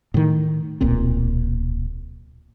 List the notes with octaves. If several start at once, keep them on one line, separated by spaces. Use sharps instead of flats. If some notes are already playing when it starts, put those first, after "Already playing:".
A2 D#3
D1 B1 A#2 C4